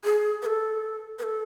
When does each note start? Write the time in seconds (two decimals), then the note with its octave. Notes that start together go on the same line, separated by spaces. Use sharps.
0.04 G#4
0.42 B4
0.46 A4
1.19 B4
1.23 A4